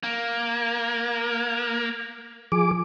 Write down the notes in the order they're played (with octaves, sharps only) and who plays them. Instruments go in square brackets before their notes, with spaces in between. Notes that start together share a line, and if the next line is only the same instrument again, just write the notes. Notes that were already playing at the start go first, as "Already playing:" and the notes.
[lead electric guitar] A#3
[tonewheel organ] F3 G#4 D6